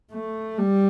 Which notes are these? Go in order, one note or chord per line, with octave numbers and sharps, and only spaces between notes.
A3
G3